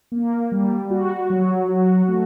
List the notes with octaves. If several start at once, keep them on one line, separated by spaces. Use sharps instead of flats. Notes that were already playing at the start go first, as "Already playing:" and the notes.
A#3
G3
F#4
F#3
F#4
A3